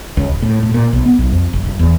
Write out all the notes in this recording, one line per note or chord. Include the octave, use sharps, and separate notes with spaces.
C#2
D1
A2
A2
A#2
B1
B3
B1
F2
F#1
F#1
E2